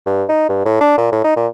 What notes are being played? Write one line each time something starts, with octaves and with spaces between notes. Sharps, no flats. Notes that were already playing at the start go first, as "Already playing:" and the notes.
G2
D#4
G2
A2
D4
A#2
A2
D#4
A#2